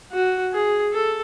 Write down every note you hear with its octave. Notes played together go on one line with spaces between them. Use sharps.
F#4
G#4
A4